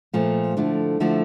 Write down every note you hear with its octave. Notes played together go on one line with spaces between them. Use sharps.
A#2 F3 A3
D3 F3 A3 E4
D3 F3 A3 E4